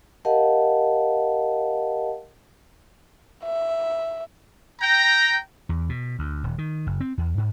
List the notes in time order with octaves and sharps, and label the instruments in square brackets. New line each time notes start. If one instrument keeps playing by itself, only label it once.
[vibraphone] G4 A#4 D#5 F5 F#5 A5
[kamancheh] E5
[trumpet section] G5 A#5
[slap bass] E2
B2
D2
D#1
D#3
F#1
C4
E2
G#2